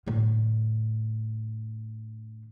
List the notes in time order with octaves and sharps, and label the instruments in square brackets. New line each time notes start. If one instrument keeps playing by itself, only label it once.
[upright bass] A2 D3